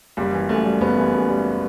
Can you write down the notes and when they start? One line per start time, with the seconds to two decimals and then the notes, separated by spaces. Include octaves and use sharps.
0.17 F#1 G3
0.33 E3
0.49 F#2 A3
0.65 G3
0.81 F#1 B3
0.98 E3
1.14 F#2
1.29 G3